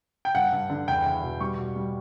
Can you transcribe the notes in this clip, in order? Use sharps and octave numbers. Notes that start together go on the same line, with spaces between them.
G5
G2 F#5
G2
D3
E2 G5
E2
B2
G3 C#6
B2
G3